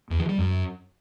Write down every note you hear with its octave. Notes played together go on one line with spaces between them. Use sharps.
E2
E3
G3
F#2